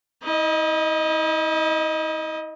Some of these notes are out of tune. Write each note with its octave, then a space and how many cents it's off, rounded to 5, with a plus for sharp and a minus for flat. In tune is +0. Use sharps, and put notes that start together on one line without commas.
E4 -45 D#5 +0